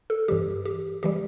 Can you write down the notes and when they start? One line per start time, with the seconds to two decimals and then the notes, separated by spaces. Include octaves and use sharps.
0.10 A4
0.28 G2 E3 G3 G4
0.65 G4
1.03 E3 G3 G4